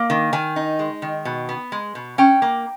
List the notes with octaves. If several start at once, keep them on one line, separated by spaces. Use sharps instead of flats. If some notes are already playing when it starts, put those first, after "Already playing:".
Already playing: A#3
D#3
D#3 G#5
D#4
G#3
D#3
B2
B3
G#3
B2
C#4 G5
A#3